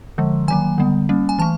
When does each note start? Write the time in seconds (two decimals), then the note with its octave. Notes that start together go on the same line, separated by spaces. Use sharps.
0.18 D3 F3 G#3
0.48 D#3 F#3 A#3 G#5
0.78 D3 G3 B3
1.09 G3 A#3 C#4
1.29 G#5
1.39 E3 A3 A5